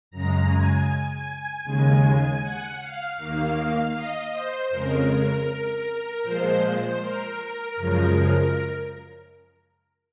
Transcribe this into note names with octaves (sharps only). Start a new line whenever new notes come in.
F#2 C#3 G#3 A#5
G#5
D#2 C#3 G#3
F#5
F5
D#2 D#3 A#3
D#5
C5
F2 C#3 G#3 A#4
A#2 F3 G#3 C5
A#4
F#2 C#3 F3 G#3